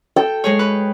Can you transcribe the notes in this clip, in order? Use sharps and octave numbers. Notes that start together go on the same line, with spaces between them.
A4 G5
G#3 G#4 C#5
B4